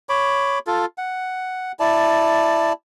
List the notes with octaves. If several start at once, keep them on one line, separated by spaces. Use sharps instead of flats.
C#5 B5 D6
F4 A4
F#5
E4 D5 A5